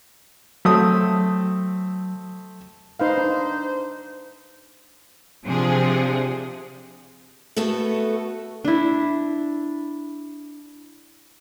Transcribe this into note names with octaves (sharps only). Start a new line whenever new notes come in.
F#3 A3 C4 D#6
D#4 B4 C5 F5
D4
C3 F3 C4 D4 F4 G#4
A3 B3 F#4 A4
D4 E4